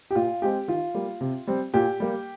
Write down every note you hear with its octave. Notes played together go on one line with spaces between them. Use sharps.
G4
A#2 F4
G#3 C4 G4
D#3 F4
G3 A#3
C3
G3 C4
A#2 G4
G3 A#3